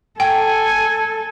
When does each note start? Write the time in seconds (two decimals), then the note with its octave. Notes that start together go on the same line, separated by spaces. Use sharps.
0.20 A4 G5 G#5